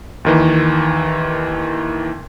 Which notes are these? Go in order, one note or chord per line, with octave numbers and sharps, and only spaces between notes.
D#2 D#3 E3